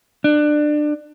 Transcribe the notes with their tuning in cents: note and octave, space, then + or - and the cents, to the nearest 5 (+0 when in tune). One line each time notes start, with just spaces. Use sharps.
D4 +25